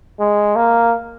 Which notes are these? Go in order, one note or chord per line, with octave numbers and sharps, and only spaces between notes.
G#3
A#3